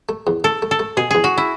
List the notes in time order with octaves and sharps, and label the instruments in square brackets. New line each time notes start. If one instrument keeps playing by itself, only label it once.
[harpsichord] A3
E2
[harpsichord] A3 [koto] A4
[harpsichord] A3
[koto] A4
[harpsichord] A3
[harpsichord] B2 [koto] G#4
[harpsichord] E2 [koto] G#4
[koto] F#4
E4